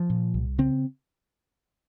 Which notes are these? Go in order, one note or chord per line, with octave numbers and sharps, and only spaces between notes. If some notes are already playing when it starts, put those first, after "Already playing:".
Already playing: F3
A#2
C2
C#3 C4